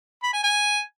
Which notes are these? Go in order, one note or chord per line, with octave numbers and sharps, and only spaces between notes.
B5
G#5
G#5